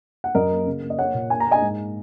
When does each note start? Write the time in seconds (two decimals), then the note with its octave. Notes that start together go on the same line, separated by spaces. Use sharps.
0.24 F#5
0.35 F#2 A#4 D#5
0.50 A#3
0.66 C#3
0.82 A#3
0.90 D#5
0.98 A#3 C#5 F#5
1.14 A#2
1.30 A#3 G#5
1.40 A#5
1.47 A#3 D#5 G#5
1.62 G#2